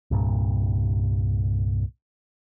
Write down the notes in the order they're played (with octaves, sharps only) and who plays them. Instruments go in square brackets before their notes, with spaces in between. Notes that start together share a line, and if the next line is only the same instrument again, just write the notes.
[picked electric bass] C2 G2 A#2